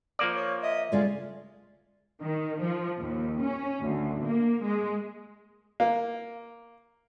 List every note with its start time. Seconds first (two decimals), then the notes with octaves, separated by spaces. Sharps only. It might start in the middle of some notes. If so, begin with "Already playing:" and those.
0.19 F3 A#3 D5
0.36 C#5
0.63 D#5 E5
0.92 C#3 G#3 A3 F4 D5
2.22 D#3
2.62 F3
2.99 D#2
3.42 C#4
3.81 D2
4.22 A#3
4.62 G#3
5.80 A#3